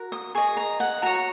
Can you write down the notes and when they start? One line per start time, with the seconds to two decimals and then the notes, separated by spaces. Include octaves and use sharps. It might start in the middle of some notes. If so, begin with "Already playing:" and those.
Already playing: F#4 A#4
0.12 D#6
0.35 G#4 D#5 C#6
0.57 A#5
0.80 F#5
1.02 F#4 C#5 A#5